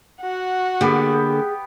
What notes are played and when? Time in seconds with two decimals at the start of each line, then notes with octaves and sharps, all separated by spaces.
0.22 F#4 F#5
0.81 D3 A#3 B3 G4 G#4